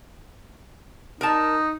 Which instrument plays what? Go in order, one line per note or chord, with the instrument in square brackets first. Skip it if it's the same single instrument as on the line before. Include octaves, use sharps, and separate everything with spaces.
[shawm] D#4 [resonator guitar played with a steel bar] A#4 A5